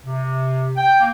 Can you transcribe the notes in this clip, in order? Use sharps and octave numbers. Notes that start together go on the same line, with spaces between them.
C3
G5
A#3